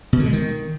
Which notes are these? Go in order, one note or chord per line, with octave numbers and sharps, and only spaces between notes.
B2
D3
G#3
D#3